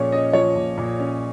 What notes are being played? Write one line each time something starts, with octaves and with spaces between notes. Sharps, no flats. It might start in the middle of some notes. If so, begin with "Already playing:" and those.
Already playing: A#2 F3 C#4 G#4 C#5
C#4 D#5
F3 C#5
A#2
A#2
C#4